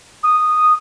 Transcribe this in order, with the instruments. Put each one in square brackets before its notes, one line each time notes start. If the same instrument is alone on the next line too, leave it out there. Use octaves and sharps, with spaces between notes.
[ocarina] D#6